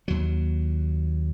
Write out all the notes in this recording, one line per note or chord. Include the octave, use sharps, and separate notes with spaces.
D#2 F#3